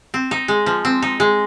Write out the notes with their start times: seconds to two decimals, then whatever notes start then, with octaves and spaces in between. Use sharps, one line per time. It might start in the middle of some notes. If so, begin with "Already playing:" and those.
0.14 C4
0.31 D#4
0.48 G#3
0.66 F3
0.85 C4
1.02 D#4
1.20 G#3